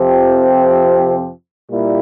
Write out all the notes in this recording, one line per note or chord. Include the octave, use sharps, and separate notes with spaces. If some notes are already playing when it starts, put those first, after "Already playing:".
Already playing: F2 C3 F3 C4 G4
A#2 G3 A#3 E4